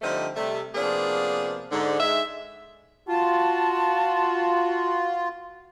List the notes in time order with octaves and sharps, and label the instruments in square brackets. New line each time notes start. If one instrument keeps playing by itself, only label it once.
[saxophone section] D3 F3 G3 A3 C4 D#4
C3 G3 A3
C3 F3 A#3 B3 D4 G#4
G#2 D3
G#2 G#3 E5
[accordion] F4 [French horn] F#4 [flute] A5